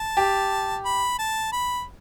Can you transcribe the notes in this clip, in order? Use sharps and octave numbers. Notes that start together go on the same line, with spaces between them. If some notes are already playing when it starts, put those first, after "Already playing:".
Already playing: A5
G4
B5
A5
B5